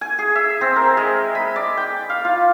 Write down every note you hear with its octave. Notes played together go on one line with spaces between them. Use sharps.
G#5
G#4
E5
C4
A#4
G#3
B5
D5
G5
F5
F4